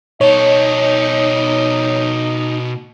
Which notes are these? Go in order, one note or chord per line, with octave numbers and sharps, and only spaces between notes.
B2 D#4 A4 C#5 D#5